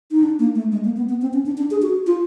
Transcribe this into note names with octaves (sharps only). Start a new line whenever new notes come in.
D#4
D4
A#3
A3
G#3
A#3
B3
B3
C4
C#4
D4
D4
G#4
F#4
F4